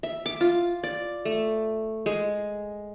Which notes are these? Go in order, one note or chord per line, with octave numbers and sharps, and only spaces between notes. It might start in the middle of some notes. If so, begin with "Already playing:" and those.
E5
D6
F4
D5
A3
G#3